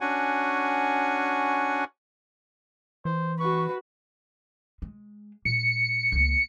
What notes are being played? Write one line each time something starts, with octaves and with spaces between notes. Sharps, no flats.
C#4 D4 F#4 F#5 G#5
E3 C5
F#4 B4 C#6
G#3
A#2 C#7
C#2 A#3